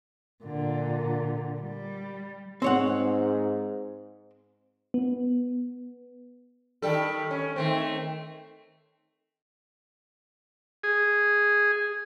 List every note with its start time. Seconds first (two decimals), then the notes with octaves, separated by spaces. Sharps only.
0.44 A#2 D3
1.60 G3
2.62 G#2 C4 C#5 F#5
4.94 B3
6.82 D#3 G3 A4
7.31 C#4
7.56 D#3 A3 C4
10.84 G#4